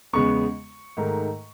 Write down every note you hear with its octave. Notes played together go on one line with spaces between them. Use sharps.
E2 C#3 G#3 B3 C#6
G#2 D#3 A3